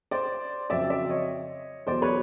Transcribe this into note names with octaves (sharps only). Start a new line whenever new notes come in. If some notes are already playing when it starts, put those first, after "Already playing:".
C5 D5
F2 C#3 F#3 D5 E5
D5 E5
C#5 D#5
E2 B2 F#3 C5 D5
B4 C#5